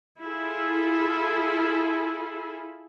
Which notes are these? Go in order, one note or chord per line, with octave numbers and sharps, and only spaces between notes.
E4 F4 G#4 A4